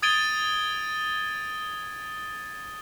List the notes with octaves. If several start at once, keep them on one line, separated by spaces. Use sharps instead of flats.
D#6 G#6 A6 D7 D#7 G7